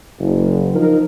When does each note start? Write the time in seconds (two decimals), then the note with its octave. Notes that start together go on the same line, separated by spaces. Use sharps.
0.20 F#1
0.74 F3 D#4 A#4